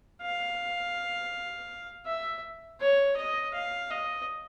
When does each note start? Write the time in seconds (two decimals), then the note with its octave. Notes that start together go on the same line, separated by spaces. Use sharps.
0.22 F5
2.06 E5
2.80 C#5
3.17 D#5
3.54 F5
3.90 D#5